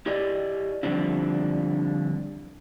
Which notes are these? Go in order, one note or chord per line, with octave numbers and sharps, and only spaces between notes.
E4 G4 D5 D#5
D3 F3 G3 C4 D4 E4